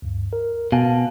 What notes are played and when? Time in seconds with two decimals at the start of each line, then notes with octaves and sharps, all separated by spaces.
0.02 D2 G2
0.33 A#4
0.72 B2 F5 G#5 A5